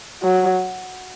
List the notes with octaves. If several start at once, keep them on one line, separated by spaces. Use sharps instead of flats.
F#3